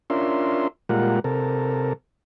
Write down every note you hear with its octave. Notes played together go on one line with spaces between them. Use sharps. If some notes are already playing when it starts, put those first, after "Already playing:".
C#4 D4 F4 A#4 E5 C6
A#2 G3 G#3 F4 A#4 F#5
C3 A4 A#4